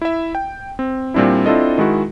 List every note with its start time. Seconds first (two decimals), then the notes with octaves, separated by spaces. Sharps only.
0.02 E4 E5
0.35 G5
0.79 C4
1.14 A#2 G3 C4 D4 E4
1.46 C4 D4 E4 F4 A4 D#5
1.78 D#3 G#3 E4 F#4